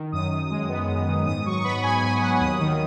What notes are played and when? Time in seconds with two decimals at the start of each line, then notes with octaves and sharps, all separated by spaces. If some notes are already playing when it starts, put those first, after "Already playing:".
Already playing: D#3
0.12 F#2 D#6
0.30 D#3
0.50 G#3
0.69 B3
0.88 F#2
1.07 D#3
1.26 G#2 D#6
1.45 F#3 C#6
1.60 C#6
1.64 B3 B5
1.83 G#2 G#5
2.03 G#2 G#5
2.21 F#3 F#5
2.40 D#2 D#6
2.60 D#3